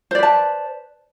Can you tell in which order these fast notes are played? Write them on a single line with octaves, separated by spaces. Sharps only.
C5 D5 B4 A5